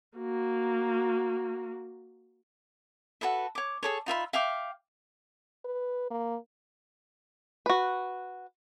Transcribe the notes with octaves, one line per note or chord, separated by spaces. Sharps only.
A#3 F#4
F#4 A4 B4 E5
C#5 D6
G#4 A4 C#5
D#4 F4 E5 B5
E5 F5 G5 D6
B4
A#3
F#4 B4